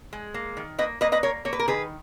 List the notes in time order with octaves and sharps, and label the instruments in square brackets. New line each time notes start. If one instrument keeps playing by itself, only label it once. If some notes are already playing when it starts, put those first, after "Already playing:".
[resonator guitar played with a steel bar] G#3
A#3
D#3
A#3 B4 D#5
A#3 B4 D#5
B4 D#5
A#3 A#4 C#5
A#3 C#5
B4
A#4
D#3 G#4 B4